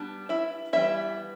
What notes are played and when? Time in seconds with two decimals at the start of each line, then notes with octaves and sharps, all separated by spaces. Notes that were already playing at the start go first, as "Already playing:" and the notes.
Already playing: G3 B3 D4
0.29 E4 E5
0.73 E3 G3 B3 E4 E5